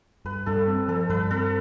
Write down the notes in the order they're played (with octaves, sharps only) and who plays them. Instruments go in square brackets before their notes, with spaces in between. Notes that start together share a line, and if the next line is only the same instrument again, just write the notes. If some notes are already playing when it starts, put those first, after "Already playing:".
[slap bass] G2 [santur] B4
[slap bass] G2 [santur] A4
[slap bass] C4
[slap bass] F3 [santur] A4
[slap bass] G2 [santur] B4
[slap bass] C4 [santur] A4